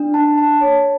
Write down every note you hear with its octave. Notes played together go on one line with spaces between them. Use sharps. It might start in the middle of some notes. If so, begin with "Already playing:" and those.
Already playing: D4
A5
A5
C#5